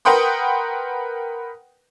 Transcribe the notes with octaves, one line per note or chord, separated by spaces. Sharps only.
A#4 B4 F#5 G5 C6 D#6